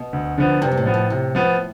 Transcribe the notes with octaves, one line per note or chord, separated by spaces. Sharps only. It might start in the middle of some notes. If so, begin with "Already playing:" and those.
Already playing: B2
D2
D3 F3 B3
G2 C3
G2
A2
F3 B3
A2
A2 C3
F3 B3